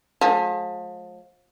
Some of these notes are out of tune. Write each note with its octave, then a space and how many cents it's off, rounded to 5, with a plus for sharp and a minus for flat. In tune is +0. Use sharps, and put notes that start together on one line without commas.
F3 +35 G#3 +45